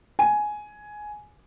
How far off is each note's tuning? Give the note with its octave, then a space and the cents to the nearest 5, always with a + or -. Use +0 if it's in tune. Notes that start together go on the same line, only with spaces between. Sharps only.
G#5 +10